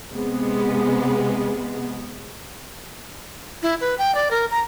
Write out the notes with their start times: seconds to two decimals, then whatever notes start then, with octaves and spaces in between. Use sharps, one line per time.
0.11 C3 G#3 B3
3.63 E4
3.81 B4
3.98 G5
4.15 D5
4.31 A#4
4.51 A#5